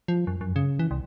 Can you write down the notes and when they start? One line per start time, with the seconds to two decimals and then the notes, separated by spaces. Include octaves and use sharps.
0.08 F3
0.27 F#2
0.41 F#2
0.56 C#3
0.79 E3
0.91 C2